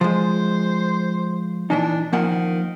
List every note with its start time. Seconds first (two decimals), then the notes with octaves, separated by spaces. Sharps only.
0.01 F3 G#3 C5
1.70 A#2 E3 D4 D#4
2.13 D#3 F3 A#3 F#5